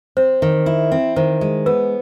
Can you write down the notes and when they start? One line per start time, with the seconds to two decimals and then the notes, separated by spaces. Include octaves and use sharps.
0.17 C4 C5
0.42 D#3
0.66 E4
0.92 C4
1.16 D#3 C5
1.41 G#3
1.66 B3 B4